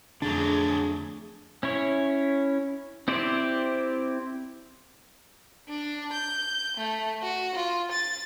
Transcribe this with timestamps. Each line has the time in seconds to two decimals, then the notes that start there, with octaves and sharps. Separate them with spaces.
0.22 F2 D3 F#3 A3 D4 G#4 A#5
1.63 C#4 E4 C#5
3.08 C4 E4 G4 C5 D5
5.69 D4
6.13 G6
6.77 A3
7.23 F#4
7.55 F4
7.92 A6